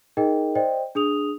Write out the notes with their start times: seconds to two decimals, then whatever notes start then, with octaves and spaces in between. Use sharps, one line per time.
0.17 D#4 G#4 A#4 D#5 G5
0.55 C5 D5 D#5 G5
0.95 D4 G#4 D#6 F7